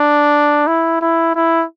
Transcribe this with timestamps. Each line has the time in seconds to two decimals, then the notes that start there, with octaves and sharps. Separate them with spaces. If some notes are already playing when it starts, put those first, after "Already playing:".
Already playing: D4
0.67 E4
1.01 E4
1.35 E4